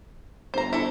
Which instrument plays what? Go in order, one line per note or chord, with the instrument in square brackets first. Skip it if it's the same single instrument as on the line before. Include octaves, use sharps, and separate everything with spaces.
[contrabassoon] G1 [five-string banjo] C5 A#5
[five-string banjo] E4 A4